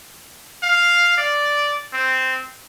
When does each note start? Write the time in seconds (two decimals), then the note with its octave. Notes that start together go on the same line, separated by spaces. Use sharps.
0.63 F5
1.17 D5
1.93 C4